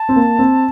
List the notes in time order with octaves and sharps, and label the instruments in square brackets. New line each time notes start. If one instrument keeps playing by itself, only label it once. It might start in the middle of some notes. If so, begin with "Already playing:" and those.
Already playing: [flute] A5
[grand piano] C4
A#3
C4